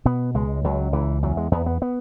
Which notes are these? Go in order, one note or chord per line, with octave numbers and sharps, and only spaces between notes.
B2 B3
C#2 G#3
C#2 F#3
C#2 E3
E2 F#3
G#3
E2 B3
B3
B3